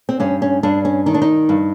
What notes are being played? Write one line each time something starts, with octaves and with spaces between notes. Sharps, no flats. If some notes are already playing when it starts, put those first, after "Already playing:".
C4
G2 C#4
C#4
G2 D4
C#4
D#3 D#4
D4
D#4
G2